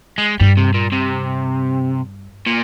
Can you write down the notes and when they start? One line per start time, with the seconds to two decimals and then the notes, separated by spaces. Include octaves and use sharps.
0.18 G#3
0.40 G2 G3
0.57 C3
0.75 A#2
0.92 C3
2.46 A#2